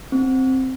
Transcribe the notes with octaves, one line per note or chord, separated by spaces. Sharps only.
C4